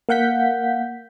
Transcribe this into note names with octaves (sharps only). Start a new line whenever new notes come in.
A#3 F5 F#5 G6 B6